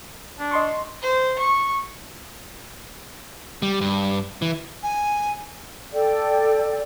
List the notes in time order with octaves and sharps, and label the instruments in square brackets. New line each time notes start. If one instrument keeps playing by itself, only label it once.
[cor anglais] D4
[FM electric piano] D#5 C6 C#6
[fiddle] C5
C#6
[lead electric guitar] G3
G2
E3
[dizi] G#5
[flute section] A4 D5 G5